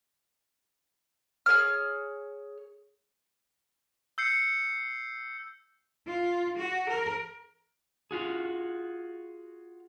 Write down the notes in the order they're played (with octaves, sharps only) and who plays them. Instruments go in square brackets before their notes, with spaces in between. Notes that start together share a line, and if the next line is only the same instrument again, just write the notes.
[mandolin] G#4 A#4 C#5 F6
[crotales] E6 G6 C7 C#7
[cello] F4
F#4
A#4
[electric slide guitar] F4 F#4 G#4